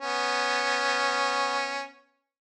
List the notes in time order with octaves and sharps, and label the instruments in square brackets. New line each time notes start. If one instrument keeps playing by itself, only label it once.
[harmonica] B3 C#4